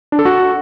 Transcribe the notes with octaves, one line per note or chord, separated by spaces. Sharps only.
D4
A4
F#4